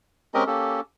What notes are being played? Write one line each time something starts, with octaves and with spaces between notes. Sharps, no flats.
G#3 C4 C#4 G4 A#4 D#5
A#3 C#4 G4 A4